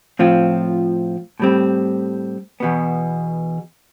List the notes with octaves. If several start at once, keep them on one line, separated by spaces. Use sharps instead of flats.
A2 F3 C4 F4
A2 G3 C4
E2 B2 B3